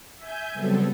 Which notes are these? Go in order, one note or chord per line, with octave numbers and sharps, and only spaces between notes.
E5 G#5 G6
C#3 F#3 G3 B3 C4 A4